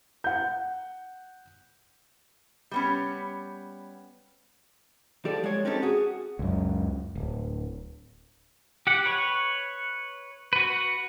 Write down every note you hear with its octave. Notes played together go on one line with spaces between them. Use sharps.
F#5 G6
G3 B3 C#4
F3 G4 A4 D5
G#3 C#5
C4 C#4 D#4 G4 A4
F#4 G#4
C#2 F#2
D1
G4 F#5
B4 C#5
F#4 B4